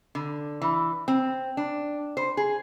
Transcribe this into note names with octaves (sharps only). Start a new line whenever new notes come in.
D3
E3
C4
D4
C5
G#4